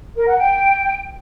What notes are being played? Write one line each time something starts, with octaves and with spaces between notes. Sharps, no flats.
A#4
F#5
G5